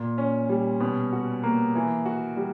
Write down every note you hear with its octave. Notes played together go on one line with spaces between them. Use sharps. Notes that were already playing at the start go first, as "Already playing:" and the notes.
Already playing: A#2
C#4
G3
B2
F#4
A#3
E3
F#4
G3